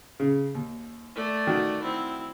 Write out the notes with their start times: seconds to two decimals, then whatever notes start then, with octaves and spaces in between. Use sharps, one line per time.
0.20 C#3
0.55 D#2
1.15 A3 D5
1.47 D#3 F#4
1.82 C4 E4